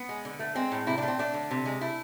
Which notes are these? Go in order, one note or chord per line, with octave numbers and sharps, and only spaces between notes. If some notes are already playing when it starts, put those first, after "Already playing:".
Already playing: B3
G#3
D3
A3
G#3 C4
A2
C3 E4
A3 D4
C4
A3 D4
D3
C3
G#3
A3 E4